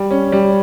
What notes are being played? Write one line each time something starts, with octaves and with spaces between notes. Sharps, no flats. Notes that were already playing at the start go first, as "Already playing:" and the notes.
Already playing: G3
C#4
G3